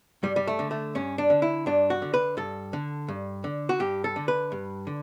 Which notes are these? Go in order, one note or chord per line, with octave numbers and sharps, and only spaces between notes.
G2 G3
G3
A3
D3
A3
G2 C#4
D4
D3
E4
G2 D4
F#4
D3
B4
G2 A4
D3
G2
D3
F#4
G2 G4
A4
D3
B4
G2
D3